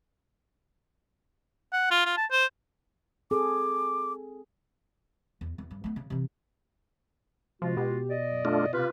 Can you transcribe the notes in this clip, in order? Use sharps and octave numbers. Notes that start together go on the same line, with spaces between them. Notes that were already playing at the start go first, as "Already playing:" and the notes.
F#5
F4
F4
A5
C5
C4 G#4 A4 D6
E2
E2
G2
A3 B3
C#3
C3 E3
C3 F3 G#3 F4 F#4
B2 G4
D5 D#5
F#2
A3 D4 F4
C3 F4 G4 B4